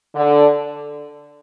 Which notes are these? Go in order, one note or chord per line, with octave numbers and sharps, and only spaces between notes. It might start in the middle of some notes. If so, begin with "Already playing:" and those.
D3